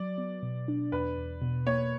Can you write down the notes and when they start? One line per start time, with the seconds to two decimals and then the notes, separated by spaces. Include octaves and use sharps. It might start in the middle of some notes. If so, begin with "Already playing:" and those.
Already playing: F#3 D5
0.18 B3
0.43 B2
0.68 D4
0.92 E2 B4
1.17 E2
1.42 B2
1.67 A#3 C#5